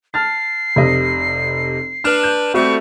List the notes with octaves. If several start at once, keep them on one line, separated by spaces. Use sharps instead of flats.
A5 F6 A6 C7
F1 C3 D#5
D4 B4 F6
G6
G3 A3 C4 F#4 C#6